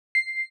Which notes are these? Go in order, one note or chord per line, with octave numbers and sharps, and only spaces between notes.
C7